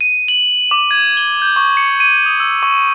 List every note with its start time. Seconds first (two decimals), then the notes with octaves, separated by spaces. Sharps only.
0.01 D#7
0.28 F#7
0.71 D6
0.91 G#6
1.17 G7
1.42 G6
1.56 C#6
1.77 C#7
2.00 D#7
2.26 D#6
2.40 E6
2.63 C#6